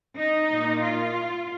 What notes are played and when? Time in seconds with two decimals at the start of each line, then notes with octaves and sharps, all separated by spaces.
0.17 D#4
0.51 A#2 A#3
0.83 F4